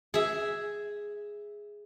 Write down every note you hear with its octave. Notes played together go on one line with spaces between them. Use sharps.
G#4 E5